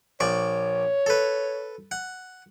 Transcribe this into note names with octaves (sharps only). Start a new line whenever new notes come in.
A#1 C#5 D5 C#6
A4 B4
F#5